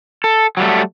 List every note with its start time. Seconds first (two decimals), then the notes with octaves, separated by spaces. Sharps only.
0.24 A4
0.57 F#3 G3 A3